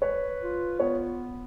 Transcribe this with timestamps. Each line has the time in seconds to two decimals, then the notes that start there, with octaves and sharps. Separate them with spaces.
0.02 B4 C#5
0.40 F4
0.79 B3 C#5